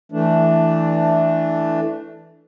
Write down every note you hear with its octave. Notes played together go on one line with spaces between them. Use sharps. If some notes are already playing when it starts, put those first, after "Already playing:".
E3 A3 D4